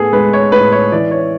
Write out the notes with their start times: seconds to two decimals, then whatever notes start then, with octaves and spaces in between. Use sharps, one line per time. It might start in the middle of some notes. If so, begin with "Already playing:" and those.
Already playing: A2 B3 G#4 A4
0.13 G#3 B4
0.33 C#5
0.52 A2 B4
0.72 C#5
0.92 E3 D5
1.11 C#5